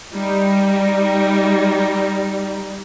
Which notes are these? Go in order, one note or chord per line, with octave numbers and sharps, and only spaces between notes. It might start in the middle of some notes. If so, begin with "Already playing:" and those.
G3 D#4